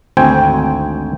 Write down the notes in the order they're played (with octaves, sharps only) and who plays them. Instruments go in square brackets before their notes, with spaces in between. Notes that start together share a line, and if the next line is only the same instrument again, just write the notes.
[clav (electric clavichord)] G#1 D2 C4 G5 G#5